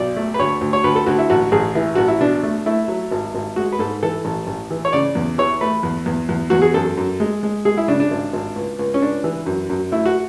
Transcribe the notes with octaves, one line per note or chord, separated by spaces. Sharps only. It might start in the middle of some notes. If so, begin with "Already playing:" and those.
Already playing: B1 D5
A3
B4
D2 C#5
D2
C#5
D2 B4
A4
D2 F#4
E4
A1 F#4
A1 G#4
E3 E4
A1 F#4
E4
B2 D4
A3
A3 E4
F#3
G#1
G#1
G#3 F#4
B4
G#2 A4
E3 A4
A1
A1
E3
C#5
C#3 D5
E2
E3 C#5
A3 B4
E2
E2
E2
E2 F#4
G#4
F#2 A4
F#2
G#3
G#3
G#3 G#4
E4
C#3 D4
D4
G#1
G#1
C#2
C#2
C#4
C#2 D4
E3
F#2
F#2
A3 E4
F#4